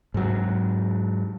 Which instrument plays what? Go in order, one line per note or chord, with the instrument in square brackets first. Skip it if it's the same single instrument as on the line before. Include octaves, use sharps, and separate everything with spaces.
[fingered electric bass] G#2 F#3